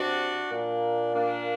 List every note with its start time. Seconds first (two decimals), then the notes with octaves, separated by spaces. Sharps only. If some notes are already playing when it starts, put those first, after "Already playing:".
Already playing: C3 D4 F#4
0.51 A#2 A#3 D4
1.14 A#3 D4